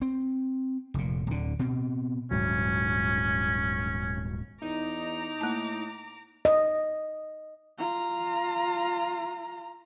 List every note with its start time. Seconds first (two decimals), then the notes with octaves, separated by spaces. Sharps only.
0.02 C4
0.94 F1 A#2
1.27 D1 D3
1.59 B2 C4
2.31 D#1 G#2 F#3 C#4
4.62 E2 D#4 A#5 D6
5.41 A2 A#3 A5
6.45 D#5
7.78 F4 A#5